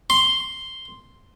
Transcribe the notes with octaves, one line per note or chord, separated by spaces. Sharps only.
C6